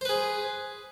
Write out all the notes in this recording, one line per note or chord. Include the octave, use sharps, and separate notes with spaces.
G#4 B4 C5